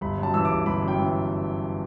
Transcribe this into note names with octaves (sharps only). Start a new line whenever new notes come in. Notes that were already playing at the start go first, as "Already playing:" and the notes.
G1 B5
F#2 A5
E3 E6
G1 D6
G1 B5
F#2
G5
E3